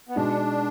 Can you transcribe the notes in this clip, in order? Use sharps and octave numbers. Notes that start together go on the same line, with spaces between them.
B3
B2 G#3 D4 D#4